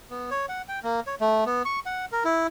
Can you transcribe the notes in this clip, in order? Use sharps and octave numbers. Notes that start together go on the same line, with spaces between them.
B3
C#5
F#5
G5
A#3
C#5
A3
B3
C#6
F#5
A#4
E4